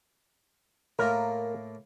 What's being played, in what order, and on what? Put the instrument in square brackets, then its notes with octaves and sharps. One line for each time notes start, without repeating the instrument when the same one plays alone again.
[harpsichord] A2 A#3 F4 [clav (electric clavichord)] A#4